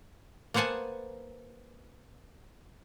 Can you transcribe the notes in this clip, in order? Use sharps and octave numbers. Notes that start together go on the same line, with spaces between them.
A#3 B3 C5 F#5 G#5 A5